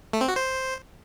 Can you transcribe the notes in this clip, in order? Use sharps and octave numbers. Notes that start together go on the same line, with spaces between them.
A3
C4
F#4
C5